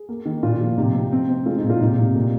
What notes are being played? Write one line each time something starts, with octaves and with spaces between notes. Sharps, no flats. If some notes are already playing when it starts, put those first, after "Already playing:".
Already playing: G#4
A#3
D#3
A#2 F4
F3
C3 D#4
C4
C4
C4
G#3 F4
D#4
A#2
F4
C3 D#4
C3
A#2